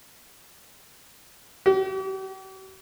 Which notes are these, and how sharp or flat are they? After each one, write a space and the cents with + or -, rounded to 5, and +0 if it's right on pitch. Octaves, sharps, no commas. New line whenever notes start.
G4 -45